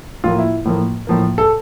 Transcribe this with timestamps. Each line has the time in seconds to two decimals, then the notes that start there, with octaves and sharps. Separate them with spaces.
0.24 A2 F3 A#3 F4
0.38 E4
0.65 A2 F3 A#3
1.07 A2 F3 A#3
1.38 A4